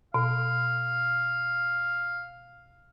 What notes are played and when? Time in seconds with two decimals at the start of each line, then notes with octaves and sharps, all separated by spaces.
0.14 B2 F5